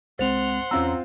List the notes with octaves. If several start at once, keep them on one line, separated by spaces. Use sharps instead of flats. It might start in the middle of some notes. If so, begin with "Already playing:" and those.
C2 G#3 C4 C5 F#5 C6 F7
E2 C4 C#4 F4 A#5 E6